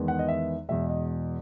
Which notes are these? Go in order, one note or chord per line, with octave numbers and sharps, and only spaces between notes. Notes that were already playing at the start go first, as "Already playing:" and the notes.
Already playing: E2 D#3 G#3 B3
F#5
D#5
E5
E2 B2 G#3 E5
D#5